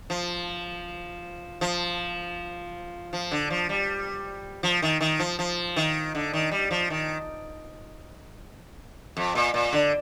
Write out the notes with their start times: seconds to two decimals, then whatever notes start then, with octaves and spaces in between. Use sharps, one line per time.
0.10 F3
1.61 F3
3.13 F3
3.31 D3
3.50 F3
3.69 G3
4.63 F3
4.82 D#3
5.01 D#3
5.19 F3
5.39 F3
5.76 D#3
6.15 D3
6.33 D#3
6.51 G3
6.71 F3
6.90 D#3
9.17 F2
9.35 A#2
9.54 A#2
9.73 D3